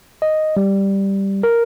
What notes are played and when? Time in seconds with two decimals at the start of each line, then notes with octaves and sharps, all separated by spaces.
0.22 D#5
0.57 G3
1.43 A#4